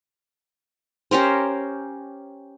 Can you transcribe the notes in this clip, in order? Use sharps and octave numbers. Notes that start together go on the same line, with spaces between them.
C#4 G4 A#4 C5